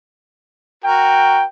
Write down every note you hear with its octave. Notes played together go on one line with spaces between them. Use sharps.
F#4 A#4 G5